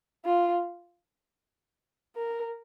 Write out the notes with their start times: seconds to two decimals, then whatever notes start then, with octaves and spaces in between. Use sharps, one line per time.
0.25 F4
2.16 A#4